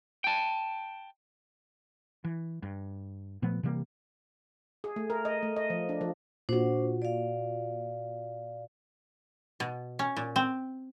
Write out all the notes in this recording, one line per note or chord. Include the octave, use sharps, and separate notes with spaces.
G5 A5
E3
G2
A#2 F3 A3 B3
C3 E3 G3 A#3
G#4
A3
A#4
D#5
A3
D#5
F3
D4
F3
A#2 D4 F#4 C5
D5 F5
B2
C#4
A#2
C4